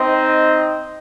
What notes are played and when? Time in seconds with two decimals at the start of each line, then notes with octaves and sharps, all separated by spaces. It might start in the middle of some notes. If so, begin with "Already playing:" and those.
Already playing: C4 D#4 C5 D#5